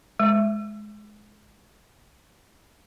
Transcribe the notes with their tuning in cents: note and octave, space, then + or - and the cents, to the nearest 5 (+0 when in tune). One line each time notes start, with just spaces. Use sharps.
G#3 +20